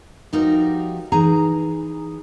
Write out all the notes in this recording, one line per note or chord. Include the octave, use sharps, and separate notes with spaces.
F3 G3 D#4 F#4 G4 A#4
E3 D#4 G#4 A#5